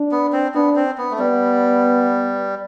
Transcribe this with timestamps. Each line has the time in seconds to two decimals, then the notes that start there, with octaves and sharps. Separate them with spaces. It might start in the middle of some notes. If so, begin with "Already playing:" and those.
Already playing: D4
0.11 B3
0.32 C4
0.54 B3 D4
0.76 C4
0.98 B3
1.11 A3
1.19 G3 B3